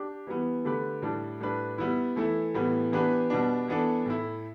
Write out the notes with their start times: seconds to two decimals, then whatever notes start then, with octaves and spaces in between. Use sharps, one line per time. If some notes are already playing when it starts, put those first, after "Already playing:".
Already playing: D4 G4
0.27 E3 G3 B3
0.65 D3 A3 G4 B4
1.02 A2 G3 D4 A4
1.40 A2 G3 D4 B4
1.78 G3 B3 E4
2.16 E3 A3 E4
2.54 A2 E3 G3 B3
2.92 E3 B3 D4 G4 B4
3.30 B2 G3 B3 D4
3.68 E3 B3 D4 A4
4.06 A2 A3 E4